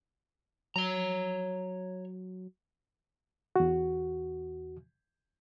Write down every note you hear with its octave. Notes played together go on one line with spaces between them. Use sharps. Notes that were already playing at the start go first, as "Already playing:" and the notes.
F#3 C#5 A#5
E2 F#4